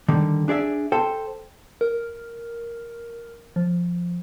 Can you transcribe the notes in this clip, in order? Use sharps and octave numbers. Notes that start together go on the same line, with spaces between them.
D3 D#3 G3
D4 G#4 D5 E5
A4 C5 G5
A#4
F3